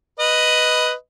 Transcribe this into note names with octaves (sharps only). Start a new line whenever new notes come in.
B4 D#5